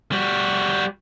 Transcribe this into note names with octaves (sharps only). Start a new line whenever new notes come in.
G3 F#4